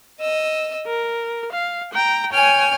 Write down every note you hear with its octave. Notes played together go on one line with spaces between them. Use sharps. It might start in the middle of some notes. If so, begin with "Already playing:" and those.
D#5 E6
A#4
F5
G5 A#5
C#5 G5 G#5 F6